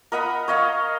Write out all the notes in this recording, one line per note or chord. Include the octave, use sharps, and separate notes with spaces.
A#4 D#5 F#5 B5
C#5 D#5 F5